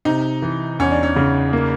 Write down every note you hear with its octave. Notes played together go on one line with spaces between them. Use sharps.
C3 D#4
E3
E2 C#4
D4
C#4
C#3
A#3